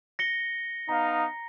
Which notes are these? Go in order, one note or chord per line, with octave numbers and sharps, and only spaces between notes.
A#6 C#7 G7
B3 D#4 F5 A#5